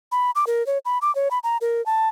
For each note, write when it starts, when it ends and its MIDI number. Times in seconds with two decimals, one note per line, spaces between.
0.12 0.31 83
0.35 0.45 86
0.47 0.65 70
0.67 0.78 73
0.85 0.98 83
1.02 1.13 86
1.15 1.29 73
1.31 1.39 83
1.44 1.57 82
1.61 1.84 70
1.86 2.09 81